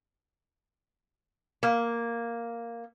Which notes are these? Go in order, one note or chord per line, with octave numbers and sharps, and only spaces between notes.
A#3